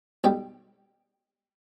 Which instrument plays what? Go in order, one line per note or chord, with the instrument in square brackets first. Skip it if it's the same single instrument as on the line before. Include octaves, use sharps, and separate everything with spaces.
[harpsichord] B1 B2 G3 G5